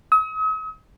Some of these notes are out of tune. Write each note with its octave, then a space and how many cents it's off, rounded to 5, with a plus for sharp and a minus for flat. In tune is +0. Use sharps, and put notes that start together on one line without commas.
D#6 +45